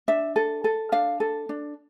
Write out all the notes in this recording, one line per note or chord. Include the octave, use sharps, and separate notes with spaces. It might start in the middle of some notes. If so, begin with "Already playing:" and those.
D4 E5
A4
A4
D4 F5
A4
D4